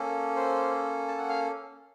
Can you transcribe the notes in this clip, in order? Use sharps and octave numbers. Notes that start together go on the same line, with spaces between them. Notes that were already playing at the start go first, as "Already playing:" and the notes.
Already playing: A#3 C#4 A4
C5
A5
F#5
F5